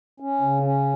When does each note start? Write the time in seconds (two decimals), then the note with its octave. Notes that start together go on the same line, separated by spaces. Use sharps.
0.20 C#4
0.41 C#3
0.62 C#4